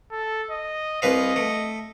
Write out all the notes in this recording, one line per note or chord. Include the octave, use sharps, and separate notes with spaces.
A4
D#5
C2 B4 D#5 F5
A3